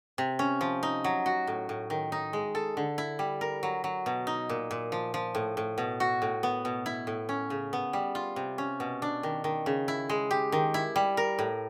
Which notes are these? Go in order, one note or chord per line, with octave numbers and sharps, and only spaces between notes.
C3
C#4
F3
D#4
F#3
F#4
A2
A2
D#3
D#4
G#3
A4
D3
E4
G3
A#4
F#3
F#3
B2
D#4
A#2
A#2
F3
F3
A2
A2
B2
F#4
A2
B3
B2
E4
A2
C#4
C#3
B3
G3
F4
C3
C#4
B2
D4
D#3
D#3
C#3
E4
G#3
G4
D#3
E4
G3
A#4
A2